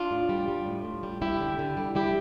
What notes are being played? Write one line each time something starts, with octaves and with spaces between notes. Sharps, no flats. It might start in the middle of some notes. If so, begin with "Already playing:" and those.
Already playing: D4 F4
A2
G3
G3
A2
A2
G3
G3 E4 G4
D3
D3
G3
G3 E4 G4